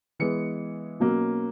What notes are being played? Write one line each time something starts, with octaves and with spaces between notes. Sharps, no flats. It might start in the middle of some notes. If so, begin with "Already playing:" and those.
E3 G#3 B3 C#7
B2 F#3 A#3 C#4